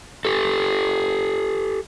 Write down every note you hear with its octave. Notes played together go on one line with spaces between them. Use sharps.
G4 A4